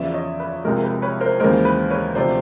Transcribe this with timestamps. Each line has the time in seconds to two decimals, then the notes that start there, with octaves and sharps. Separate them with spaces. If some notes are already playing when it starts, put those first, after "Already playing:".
Already playing: E2 C#3 F3 D5 E5
0.14 C#5 D#5
0.40 B4
0.65 C2 C3 F3 G#3 A#4
0.83 B4
1.02 B4 C#5
1.21 A#4 C5
1.40 D#2 C#3 E3 G#3 A#4 C5
1.65 B4
1.90 B4 C#5
2.15 D2 C3 F3 C5 D5